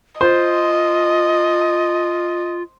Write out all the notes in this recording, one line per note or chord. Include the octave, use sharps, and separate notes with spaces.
F4 C5 D#5